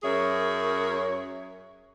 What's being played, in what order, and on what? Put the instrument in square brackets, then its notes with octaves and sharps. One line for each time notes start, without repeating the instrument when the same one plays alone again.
[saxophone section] F#2 G#4 A#4 C#5 E5